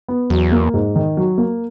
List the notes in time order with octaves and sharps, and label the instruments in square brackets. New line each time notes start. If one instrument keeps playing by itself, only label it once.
[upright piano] B3
[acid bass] E2 [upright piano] F#3
[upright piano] A#3
G#2
D#3
F#3
A#3